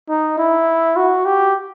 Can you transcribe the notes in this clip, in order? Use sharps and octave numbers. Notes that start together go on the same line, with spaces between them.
D#4
E4
F#4
G4